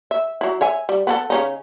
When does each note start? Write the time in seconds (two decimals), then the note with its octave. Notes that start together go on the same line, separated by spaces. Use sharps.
0.11 E5
0.41 F#3 E4
0.61 C#5 E5 G#5
0.89 G3
1.07 B3 F#4 A4
1.30 C#3 C#4 D#4